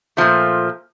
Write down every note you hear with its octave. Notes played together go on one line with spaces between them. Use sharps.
A#2 F3 A3